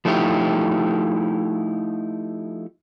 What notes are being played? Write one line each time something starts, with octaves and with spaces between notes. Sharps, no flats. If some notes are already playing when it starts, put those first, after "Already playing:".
F3 A3 D#4 E4 G4